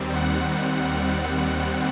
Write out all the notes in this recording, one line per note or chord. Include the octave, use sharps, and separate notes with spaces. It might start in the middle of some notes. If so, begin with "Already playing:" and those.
Already playing: D#2 D#3 G3 C4
F#5